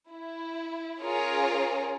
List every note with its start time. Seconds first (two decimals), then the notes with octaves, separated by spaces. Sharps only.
0.11 E4
1.04 C#4 F4 G#4 A#4 C#5